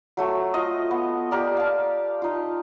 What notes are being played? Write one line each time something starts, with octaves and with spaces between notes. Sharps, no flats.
F#3 A3 F#4
F4 D#5
B3
G4 A#4 D5
F5 A5
D#4 F4